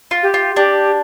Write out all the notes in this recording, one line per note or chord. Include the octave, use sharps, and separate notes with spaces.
F4
G4
F4
D4 G4